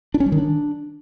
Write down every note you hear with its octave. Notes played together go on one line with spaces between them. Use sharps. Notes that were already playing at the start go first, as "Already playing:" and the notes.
D4
C#4
G3
D#3
D4